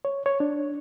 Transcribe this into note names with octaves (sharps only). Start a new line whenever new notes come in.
C#5
C#5
D4